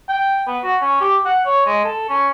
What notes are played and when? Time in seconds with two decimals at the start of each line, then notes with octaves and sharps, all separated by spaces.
0.09 G5
0.47 B3
0.63 F#4
0.81 C#4
1.01 G4
1.25 F#5
1.46 C#5
1.66 G#3
1.84 A4
2.09 C#4